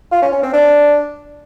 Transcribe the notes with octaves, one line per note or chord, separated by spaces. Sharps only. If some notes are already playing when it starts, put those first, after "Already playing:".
F4
C#4
C#4
C4
D4